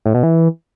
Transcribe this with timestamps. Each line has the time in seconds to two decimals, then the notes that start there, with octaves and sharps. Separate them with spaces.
0.05 A2
0.14 B2
0.23 E3